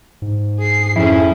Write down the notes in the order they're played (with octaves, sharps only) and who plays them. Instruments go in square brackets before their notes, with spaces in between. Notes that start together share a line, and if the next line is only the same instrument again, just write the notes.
[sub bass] G#2
[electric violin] G#4 C7
[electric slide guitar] F2 E4 [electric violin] C#4 G#4